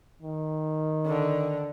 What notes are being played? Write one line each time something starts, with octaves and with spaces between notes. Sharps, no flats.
D#3
D3